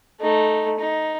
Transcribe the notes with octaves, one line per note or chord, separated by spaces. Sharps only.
A3 D#4
D#4